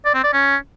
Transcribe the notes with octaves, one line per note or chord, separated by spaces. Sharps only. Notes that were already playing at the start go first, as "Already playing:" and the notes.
D5
C4
D5
C#4